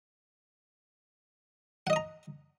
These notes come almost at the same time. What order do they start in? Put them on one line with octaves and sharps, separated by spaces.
F#5 D#5 D#6 A#5